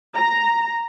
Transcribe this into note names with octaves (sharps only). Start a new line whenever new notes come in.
A#5